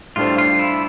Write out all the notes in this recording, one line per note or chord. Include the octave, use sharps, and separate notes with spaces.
A2 G3 D4 F4 A4 C5
F4
E4